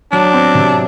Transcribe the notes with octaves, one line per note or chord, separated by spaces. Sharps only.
F#3 D4
C4
C3